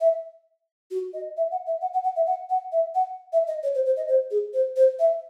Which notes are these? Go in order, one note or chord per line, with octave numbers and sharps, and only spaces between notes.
E5
F#4
D#5
E5
F#5
E5
F#5
F#5
F#5
E5
F#5
F#5
E5
F#5
E5
D#5
C#5
C5
C5
D#5
C5
G#4
C5
C5
E5